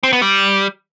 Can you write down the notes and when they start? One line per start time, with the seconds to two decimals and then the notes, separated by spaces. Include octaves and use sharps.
0.03 C4
0.13 B3
0.22 G3